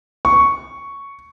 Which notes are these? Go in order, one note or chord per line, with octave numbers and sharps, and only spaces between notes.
C#6